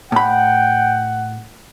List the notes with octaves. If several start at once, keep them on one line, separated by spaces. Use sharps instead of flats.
A2 F#5 G5 B5